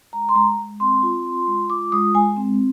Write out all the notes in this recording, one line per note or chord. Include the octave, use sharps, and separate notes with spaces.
G#3 A#5
C6
G#3 A#5
G#3
C4 C6
F4
F4
G#3
F4 D6
G#3 D#6
G#3 G#5
C4